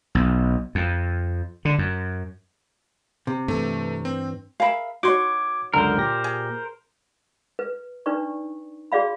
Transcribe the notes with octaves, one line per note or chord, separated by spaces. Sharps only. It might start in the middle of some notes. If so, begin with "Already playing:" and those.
B1
F2
D3
F#2
C3
G2 E3 A3
C4
G#4 A#4 E5 F5 B5
D#4 F#4 C#5 C6 D6 G#6
C#2 F#2 D3 A#4 C5
A#2 G4 A#6
G#4
B4
D4 D#4 B4 D5 C#6
F#4 G#4 D5 F5 B5